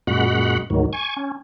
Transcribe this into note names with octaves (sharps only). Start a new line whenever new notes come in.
F#2 A#2 G#3 F#4 F#5 B5
D2 G#2 D#3 F#3
G#5 C#6
C#4